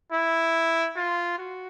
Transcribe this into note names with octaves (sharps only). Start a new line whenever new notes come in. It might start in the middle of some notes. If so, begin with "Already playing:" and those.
E4
F4
F#4